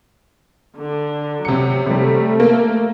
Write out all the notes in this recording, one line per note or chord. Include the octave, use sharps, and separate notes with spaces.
D3
C3 F#3 C#7
C3 G3 A3
A#3